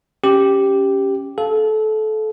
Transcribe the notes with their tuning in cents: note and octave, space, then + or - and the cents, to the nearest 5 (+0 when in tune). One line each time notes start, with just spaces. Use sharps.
C#4 +0 G4 +0
A4 -25 F5 +0